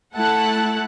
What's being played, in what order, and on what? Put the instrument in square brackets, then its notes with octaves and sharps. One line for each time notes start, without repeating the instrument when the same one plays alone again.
[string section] A3 E4 A4 F#5 A5 F#6